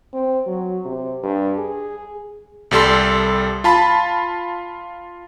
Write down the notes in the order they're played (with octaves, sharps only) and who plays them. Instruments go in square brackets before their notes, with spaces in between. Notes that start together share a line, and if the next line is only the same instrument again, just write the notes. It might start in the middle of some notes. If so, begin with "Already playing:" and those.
[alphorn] C4
F#3
C3
G2
G#4
[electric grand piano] C2 G3 A4 C6
F4 A5 B5